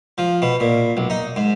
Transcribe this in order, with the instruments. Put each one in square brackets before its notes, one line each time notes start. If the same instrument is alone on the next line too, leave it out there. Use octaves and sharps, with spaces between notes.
[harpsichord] F3
B2
A#2
B1
D#4
G#2